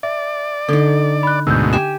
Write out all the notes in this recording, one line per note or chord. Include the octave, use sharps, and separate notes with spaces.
D5 E5
D3 D#4 A4
B5 F#6
D2 G#2 B2 E6 G6
G4 G#5 E7